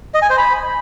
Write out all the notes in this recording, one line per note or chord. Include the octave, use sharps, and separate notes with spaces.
D#5
G#5
C5
B5